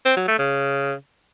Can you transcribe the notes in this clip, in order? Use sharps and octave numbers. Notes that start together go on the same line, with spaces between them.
C4
F#3
A3
C#3